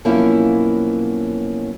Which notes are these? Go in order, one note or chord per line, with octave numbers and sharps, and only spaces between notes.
B2 F3 F#3 A#3 C#4 E4